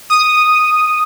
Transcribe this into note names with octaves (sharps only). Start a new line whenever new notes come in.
D#6